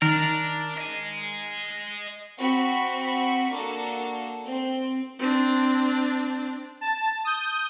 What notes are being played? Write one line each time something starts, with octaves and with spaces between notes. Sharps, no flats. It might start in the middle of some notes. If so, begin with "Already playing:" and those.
D#3 D4 A#4
D#5 G#5
C4 F#4 B5 C#6 B6
A#3 D4 F#4 A4
C4
C4 D4
A5
D#6 G6